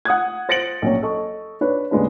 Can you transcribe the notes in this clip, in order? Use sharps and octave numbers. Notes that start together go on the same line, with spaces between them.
F#5 D#6 F#6 G#6
C5 A6 A#6 C#7 D7 F#7
A#1 F#3 C#4
A4 D#5 C#6
D4 B4 C#5
D#1 C#3 G#3 D4 B4